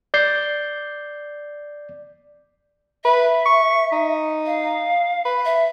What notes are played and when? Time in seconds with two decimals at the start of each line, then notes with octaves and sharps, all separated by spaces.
0.14 D5 G6 C7
3.04 B4 E5
3.46 C#6
3.92 D#4
4.46 F5
5.25 B4
5.45 E5